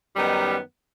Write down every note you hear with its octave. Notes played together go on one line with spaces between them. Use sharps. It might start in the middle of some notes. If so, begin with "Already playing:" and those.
F#2 D#3 G3 B3 D#4